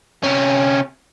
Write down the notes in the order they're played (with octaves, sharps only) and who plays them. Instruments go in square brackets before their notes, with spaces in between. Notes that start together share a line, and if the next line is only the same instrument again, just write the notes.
[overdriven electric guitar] C3 C#4